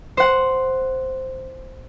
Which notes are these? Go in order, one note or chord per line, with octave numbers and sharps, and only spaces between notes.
C5 F#5